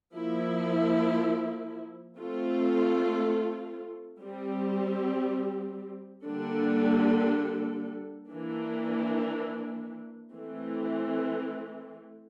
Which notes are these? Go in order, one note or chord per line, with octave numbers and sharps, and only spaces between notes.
F3 A#3 E4
A3 C4 F4 A4
G3 C4 G4
D3 G3 A#3 D4 A4
E3 A#3 D4
E3 A3 C4